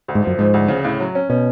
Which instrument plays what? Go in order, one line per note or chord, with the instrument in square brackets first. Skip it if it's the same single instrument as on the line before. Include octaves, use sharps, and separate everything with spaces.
[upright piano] D2
[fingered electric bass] G#2
[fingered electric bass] F#2 [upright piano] F3
[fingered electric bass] G#2 [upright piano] F3
[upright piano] D2
C#3
A2
F#3
C#4
[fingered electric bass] B2 [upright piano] C#4